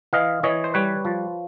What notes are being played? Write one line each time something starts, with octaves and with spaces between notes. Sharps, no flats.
E3 D#5 F5
E3 C#5 D#5
C5
G3 B4 C#5
F3